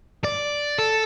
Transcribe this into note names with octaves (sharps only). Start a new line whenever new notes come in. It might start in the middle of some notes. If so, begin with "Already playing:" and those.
D5
A4